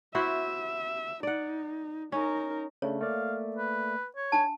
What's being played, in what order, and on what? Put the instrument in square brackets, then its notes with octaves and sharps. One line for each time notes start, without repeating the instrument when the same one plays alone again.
[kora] E4 F#4 C5 [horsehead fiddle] E5
[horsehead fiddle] D#4 [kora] D5 F#5
[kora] C#4 [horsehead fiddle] D#4 A#4
[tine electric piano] C#3 A3 D4 [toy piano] C#5
[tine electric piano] A3 A#3 D5 [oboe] F5
[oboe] B4
C#5
[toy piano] D4 A5